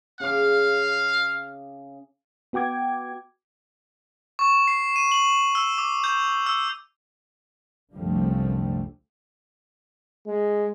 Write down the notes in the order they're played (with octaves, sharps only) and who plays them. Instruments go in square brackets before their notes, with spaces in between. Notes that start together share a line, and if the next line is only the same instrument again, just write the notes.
[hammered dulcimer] C#3 D6 [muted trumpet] F5
[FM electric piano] B3 F#4 G5 D6 G#6
[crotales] C#6
C7
D#7
F#7
E6
D6
G6
E6
[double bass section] C2 F#2 D3 F3 G3 A3
[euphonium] G#3